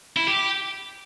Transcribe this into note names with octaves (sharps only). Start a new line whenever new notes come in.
E4
G4